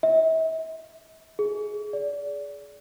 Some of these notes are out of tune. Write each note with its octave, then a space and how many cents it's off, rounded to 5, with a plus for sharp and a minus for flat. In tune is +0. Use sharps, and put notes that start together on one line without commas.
E5 -40
G#4 +15
D5 -30